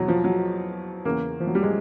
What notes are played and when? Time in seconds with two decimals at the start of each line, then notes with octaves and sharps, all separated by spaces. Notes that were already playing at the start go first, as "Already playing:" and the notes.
Already playing: E2 B2 F#3
0.08 F3
0.24 F#3
1.05 E2 C#3 E3 A#3
1.40 F3
1.47 F#3
1.55 G3
1.63 G#3